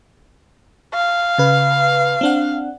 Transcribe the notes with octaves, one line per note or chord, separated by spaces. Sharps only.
F5
C#3 B4
C4 D4 F#5